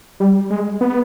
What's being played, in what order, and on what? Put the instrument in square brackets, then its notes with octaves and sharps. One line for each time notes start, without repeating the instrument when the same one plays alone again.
[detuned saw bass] G3
G#3
B3